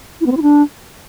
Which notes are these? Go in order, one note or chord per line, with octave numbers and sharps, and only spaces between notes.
E4
B3
C4
E4
D4